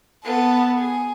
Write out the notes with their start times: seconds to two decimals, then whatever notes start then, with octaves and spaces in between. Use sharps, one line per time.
0.24 B3 A4
0.78 G#4